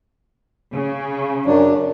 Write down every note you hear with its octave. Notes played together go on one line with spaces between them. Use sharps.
C#3
F#2 F#3 D4